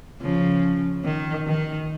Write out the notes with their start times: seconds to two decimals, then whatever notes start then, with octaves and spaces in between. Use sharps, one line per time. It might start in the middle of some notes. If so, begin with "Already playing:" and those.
0.21 C#3 F3
1.05 D#3
1.47 D#3